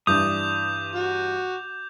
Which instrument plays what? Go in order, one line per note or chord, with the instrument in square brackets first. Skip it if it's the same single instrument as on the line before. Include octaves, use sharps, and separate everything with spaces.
[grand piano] G2 E3 D4 [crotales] D6 G6 F7 [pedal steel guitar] D#6
[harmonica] F#4